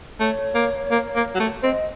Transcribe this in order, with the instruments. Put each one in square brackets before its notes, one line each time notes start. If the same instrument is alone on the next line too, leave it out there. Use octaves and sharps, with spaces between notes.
[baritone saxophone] A3 [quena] C#5
[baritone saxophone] A#3
A#3
A#3
F#3
A3
[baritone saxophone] C4 [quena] D#5